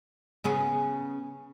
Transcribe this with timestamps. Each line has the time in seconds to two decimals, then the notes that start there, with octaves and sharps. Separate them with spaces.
0.44 C#3 B3 G#4